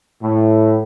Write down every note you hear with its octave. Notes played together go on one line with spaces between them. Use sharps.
A2